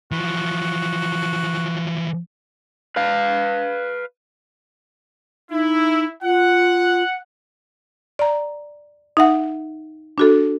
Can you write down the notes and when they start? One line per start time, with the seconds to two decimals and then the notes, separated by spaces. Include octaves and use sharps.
0.12 E3 F3 F#4
2.96 B4 F5
5.51 D#4 E4
6.23 F4 F#5
8.19 D5 A#5
9.17 D#4 E5 F#5
10.18 D4 F#4 A4